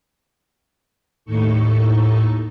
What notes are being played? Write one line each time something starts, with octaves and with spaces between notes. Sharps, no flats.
D#2 A2 D#4 A4 C#6